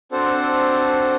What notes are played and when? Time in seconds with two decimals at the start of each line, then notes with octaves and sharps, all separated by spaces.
0.12 C4 D4 F#4 A4 C5